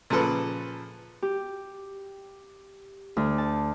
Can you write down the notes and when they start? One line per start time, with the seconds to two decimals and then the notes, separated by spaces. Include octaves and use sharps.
0.10 A#2 C#3 F3 A4 B4
1.22 G4
3.17 D2
3.38 A5